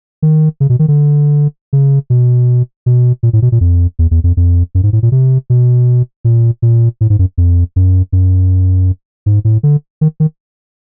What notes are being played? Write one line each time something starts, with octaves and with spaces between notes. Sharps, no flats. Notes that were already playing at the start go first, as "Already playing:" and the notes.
D#3
C#3
B2
D#3
D3
C#3
B2
B2
A#2
A2
B2
A#2
F2
E2
E2
F2
F2
F#2
G#2
A2
A#2
C3
B2
A#2
A#2
A2
G#2
F#2
F2
F#2
F#2
G#2
A2
D3
D#3
D#3